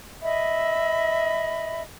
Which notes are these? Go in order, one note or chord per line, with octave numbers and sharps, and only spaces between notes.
D#5 E5 B5